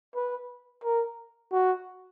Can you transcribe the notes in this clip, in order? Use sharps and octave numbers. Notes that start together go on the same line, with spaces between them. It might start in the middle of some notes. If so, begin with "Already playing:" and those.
B4
A#4
F#4